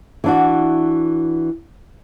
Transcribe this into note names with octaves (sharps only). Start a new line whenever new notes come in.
E3 D4 F#4